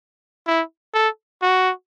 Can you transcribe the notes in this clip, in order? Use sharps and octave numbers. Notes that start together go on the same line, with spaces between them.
E4
A4
F#4